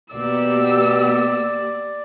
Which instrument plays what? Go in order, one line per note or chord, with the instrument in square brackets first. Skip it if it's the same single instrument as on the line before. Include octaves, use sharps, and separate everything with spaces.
[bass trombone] B2 [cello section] A#3 B3 G4 [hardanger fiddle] D5 [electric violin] E6